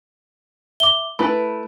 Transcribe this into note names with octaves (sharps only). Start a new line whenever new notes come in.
E5 D6 G7
A3 E4 B4 B5